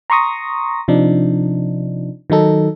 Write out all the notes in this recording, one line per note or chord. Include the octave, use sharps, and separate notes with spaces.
A#5 C6 C#6 D#6 A#6
C3 F3 D4 D#4
D#3 F#3 D#4 A4